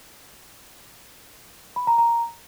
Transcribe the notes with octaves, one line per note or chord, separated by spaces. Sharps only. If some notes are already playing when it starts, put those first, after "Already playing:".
B5
A#5
A#5